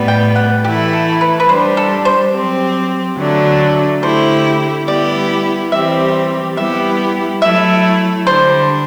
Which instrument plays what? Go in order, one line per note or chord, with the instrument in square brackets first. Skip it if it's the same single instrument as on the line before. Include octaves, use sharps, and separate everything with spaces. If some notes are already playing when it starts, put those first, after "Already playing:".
Already playing: [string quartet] A2 G3 B3
[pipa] G5
F#5
[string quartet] E3 A3 E4 [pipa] G4
[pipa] A4
B4
B4
[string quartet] G3 D4 G4 [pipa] C5
[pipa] A4
C5
[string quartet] F#3 C4 G4
D3 F#3 A3 D4
[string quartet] D3 A3 E4 G4 [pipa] C5
[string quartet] G3 B3 E4 G4 [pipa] D5
[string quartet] E3 G3 C4 G4 [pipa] E5
[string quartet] G3 B3 E4 G4 [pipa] E5
[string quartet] F#3 A3 E4 [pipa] E5
[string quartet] D3 G3 D4 [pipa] C5